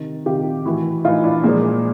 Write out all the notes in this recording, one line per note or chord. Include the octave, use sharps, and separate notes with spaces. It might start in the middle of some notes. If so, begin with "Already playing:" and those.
Already playing: C3 D#3
C3 D#3 F4 G4
A2 E3 E4 F#4
A2 E3 D#4 F4
D4 E4
A#2 F3 G#3 A#3